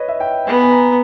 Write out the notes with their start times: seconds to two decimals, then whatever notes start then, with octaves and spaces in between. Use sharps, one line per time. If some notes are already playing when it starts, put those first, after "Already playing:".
Already playing: B4 C#5 D#5
0.08 E5
0.20 G5
0.46 B3 G#5
0.62 G#5
0.71 A#5